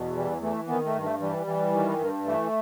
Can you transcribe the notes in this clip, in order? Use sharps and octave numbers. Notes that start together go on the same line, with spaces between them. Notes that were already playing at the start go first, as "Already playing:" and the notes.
Already playing: E2 B2
E3 G3
E3 A3
D#3 B3
A3
G2
A3
E3 G3
E3
D#3
G2
E3 A3